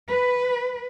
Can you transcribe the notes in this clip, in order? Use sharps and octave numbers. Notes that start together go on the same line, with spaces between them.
B4